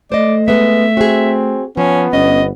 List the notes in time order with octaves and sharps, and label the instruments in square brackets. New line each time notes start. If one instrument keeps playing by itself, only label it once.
[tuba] A3 [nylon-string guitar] C5 D#5 [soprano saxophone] D5
[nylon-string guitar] G#3 B3 [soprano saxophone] E5
[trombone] C4 [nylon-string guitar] F#4 G#4
[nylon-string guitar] F3 [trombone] B3 [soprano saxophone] C#4
[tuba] G1 [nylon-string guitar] C#4 [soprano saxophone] D#5